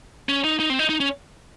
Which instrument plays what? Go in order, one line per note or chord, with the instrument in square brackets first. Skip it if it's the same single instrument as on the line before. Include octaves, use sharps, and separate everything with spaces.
[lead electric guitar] C#4
D#4
D#4
C4
D#4
D#4
C#4